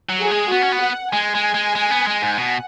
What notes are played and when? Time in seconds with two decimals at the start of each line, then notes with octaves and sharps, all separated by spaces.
0.09 F#3
0.21 G#4
0.31 G#3
0.51 B3 F#4
0.62 C#4
0.72 B3
0.83 F#5
1.13 G#3 G#5
1.35 G#3
1.54 G#3
1.75 G#3
1.91 B3
2.07 G#3
2.22 G#2
2.37 B2 F#5